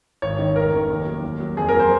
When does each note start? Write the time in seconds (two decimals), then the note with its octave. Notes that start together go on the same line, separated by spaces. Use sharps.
0.22 G#1 C#5
0.39 D#3
0.56 F1 A#4
0.73 D#3
0.90 D#2
1.07 F#3
1.23 D#2
1.40 F#3
1.57 F2 G#4
1.69 A#4
1.74 F#3
1.80 C5